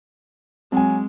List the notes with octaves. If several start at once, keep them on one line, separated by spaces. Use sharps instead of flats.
F#3 G#3 C4 G#5